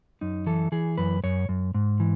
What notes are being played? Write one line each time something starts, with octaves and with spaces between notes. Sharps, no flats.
F#2 D#4
E3 A4
E3 G#4
F#2 B4
F#2 C#5
F#2
G#2
E3